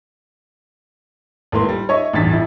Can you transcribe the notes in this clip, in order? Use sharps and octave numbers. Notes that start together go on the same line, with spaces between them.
G#1 A2 A#3 B4 C6
G3
C#5 D#5 E5 C#6
A1 E2 G2 A6 B6
F2 E4 A6